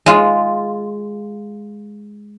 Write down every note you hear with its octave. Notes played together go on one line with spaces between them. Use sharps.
G#3 F4